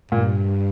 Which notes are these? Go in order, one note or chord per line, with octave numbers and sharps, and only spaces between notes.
G2 A#2